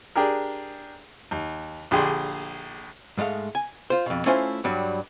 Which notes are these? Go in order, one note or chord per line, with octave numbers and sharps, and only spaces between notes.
D4 G4 G#4 A#4
D#2
A#1 D3 G4 G#4 C6
G#2 G#3 A3 F5
G#5
F4 C5
F2 B2
A3 C#4 E4 F4 C5 G#5
G2 F#3 G3